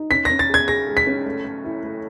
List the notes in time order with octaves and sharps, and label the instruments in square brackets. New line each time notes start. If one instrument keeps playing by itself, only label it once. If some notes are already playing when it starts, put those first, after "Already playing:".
Already playing: [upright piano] D#4
[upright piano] C#4 [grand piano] B6
[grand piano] A#6
[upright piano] C#4
[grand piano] A6
[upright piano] G#4 [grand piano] G#6
[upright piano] G#4 [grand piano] A#6
[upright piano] G#3
[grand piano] B6
[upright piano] C#4
A3
A3
E4
A3